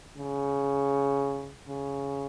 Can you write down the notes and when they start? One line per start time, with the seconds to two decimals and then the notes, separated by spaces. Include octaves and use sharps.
0.18 C#3
1.68 C#3